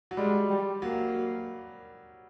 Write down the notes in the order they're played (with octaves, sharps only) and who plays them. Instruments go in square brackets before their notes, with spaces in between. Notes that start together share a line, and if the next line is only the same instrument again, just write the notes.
[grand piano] F#3
[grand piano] G3 [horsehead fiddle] G#3
[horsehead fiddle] G3
[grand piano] F#3 [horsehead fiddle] A#3